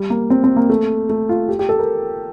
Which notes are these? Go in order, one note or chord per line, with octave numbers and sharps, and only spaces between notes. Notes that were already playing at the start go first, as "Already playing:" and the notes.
Already playing: G3
A#3
C4
C4
A#3
A3
A3
F4
G4
G4
A4
A#4